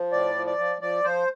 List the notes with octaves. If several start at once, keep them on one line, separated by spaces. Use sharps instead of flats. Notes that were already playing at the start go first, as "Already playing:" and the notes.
Already playing: F3
A2 D5
F3
D5
F3
F3 D5
F3 C5